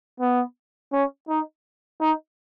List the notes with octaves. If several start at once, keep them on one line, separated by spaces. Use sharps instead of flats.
B3
C#4
D#4
D#4